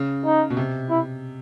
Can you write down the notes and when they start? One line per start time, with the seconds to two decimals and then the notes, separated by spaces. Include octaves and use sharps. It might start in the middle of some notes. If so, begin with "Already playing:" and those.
Already playing: C#3
0.25 D#4
0.50 B2
0.57 C3
0.90 E4